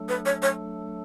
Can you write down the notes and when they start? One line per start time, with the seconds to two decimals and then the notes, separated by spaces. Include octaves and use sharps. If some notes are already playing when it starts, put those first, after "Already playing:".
Already playing: F#3 A3 D4 A4
0.09 B4
0.26 C#5
0.42 C#5